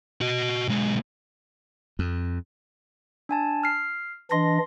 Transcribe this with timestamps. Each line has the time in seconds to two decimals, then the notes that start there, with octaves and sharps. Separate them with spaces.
0.21 F#4 D#5
0.68 B1 G#3
1.99 F2
3.29 D4 G#5 A5
3.63 F6 C7
4.31 E3 D4 D#5 C6 A#6